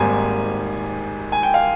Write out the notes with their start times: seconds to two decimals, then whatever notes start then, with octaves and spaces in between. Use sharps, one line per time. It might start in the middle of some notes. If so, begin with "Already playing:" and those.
Already playing: G#1 G#2 G3 A#3 G#5
1.32 G#5
1.43 G5
1.54 F5